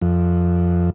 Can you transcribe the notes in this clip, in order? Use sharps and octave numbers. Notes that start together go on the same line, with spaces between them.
F2